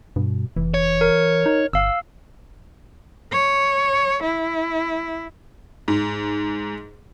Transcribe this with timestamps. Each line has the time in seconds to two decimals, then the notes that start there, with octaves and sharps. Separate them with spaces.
0.16 G2 B2
0.56 F1 E3
0.74 C#5
1.01 A#4
1.46 D#4
1.73 G1 F5 E6
3.32 C#5
4.23 E4
5.88 G#2